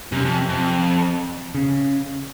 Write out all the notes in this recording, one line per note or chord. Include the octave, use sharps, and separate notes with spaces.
F#2 C3
F2
F2
C#3